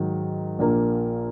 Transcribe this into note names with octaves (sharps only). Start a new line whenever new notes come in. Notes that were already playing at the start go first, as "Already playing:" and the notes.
Already playing: G#2 D#3 F#3
A#1 A#2 A#3